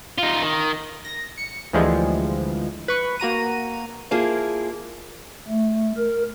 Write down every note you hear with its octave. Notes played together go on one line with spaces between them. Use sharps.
D#4 F4
D#3
A#6
C#7
D2 E3 F3 G3 G#3
B4 C#6
A#3 F#4 A#5 D#7
F3 A#3 E4 G#4
A3
A#4